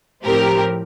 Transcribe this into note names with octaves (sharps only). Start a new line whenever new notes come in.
A2 F3 C4 G4 A#4